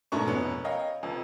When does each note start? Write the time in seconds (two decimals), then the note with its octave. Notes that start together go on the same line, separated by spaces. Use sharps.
0.12 G#2 B2 A3 D4 A#4 C#6
0.26 F1 B3 C#4
0.64 A#4 C#5 D#5 F5 G5
1.03 F1 F2